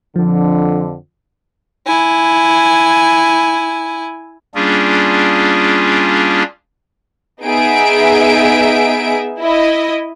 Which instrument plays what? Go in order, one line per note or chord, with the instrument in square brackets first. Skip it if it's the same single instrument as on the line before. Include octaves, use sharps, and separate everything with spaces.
[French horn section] F2 D3 [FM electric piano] F3
[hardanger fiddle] E4 G#5
[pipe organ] G3 A#3 C#4 D4 F4 G#4
[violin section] B3 D#4 G#4 E5 D7
E4 D#5